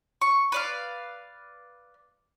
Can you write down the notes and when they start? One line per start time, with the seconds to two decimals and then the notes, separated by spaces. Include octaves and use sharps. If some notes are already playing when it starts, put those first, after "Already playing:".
0.21 C#6
0.52 B4 D5 F5